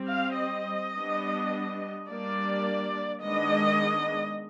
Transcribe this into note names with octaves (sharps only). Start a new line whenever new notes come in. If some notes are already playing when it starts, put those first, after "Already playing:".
Already playing: G3 C4
F5
D#5
G3 B3 D4
G3 A#3 D4 D5
D#3 G#3 B3 D4 D#5